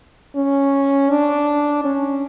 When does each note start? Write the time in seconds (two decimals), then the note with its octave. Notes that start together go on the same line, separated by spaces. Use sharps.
0.36 C#4
1.10 D4
1.85 C#4